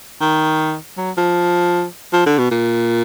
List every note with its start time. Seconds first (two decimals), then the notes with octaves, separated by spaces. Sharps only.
0.21 D#3
0.98 F#3
1.18 F3
2.13 F3
2.26 D3
2.38 B2
2.51 A#2